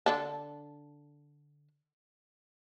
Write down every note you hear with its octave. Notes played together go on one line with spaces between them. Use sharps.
D3 D4 A4